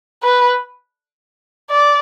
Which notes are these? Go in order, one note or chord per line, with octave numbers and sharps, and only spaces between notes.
B4
D5